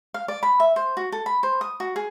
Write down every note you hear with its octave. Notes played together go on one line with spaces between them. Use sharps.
F5
D5
B5
E5
C5
F#4
A4
B5
C5
D#6
F#4
G#4